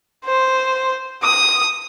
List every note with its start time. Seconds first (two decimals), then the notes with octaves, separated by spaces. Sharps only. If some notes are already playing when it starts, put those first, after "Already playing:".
0.25 C5
1.23 D#6